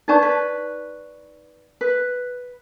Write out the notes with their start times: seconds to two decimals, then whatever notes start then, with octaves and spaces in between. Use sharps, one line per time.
0.08 D4 D#4 B4 D5 A5 C#6
0.22 B4
1.81 B4